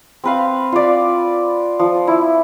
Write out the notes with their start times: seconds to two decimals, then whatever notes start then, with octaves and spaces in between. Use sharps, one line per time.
0.24 C4 B4 F5
0.72 F4 D5
1.79 F3
2.07 E4